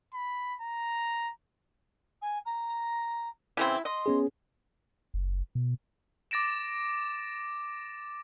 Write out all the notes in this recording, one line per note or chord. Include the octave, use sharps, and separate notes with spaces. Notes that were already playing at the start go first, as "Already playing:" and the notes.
B5
A#5
G#5
A#5
C#3 E3 C4 E4
D#5 C6
B3 C#4 G#4
F#1
B2
D6 A6 A#6 D7 E7